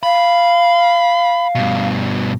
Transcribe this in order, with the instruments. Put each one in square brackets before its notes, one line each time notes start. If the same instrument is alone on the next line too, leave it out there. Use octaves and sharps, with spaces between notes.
[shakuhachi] F5 [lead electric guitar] B5
[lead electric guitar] G2 B2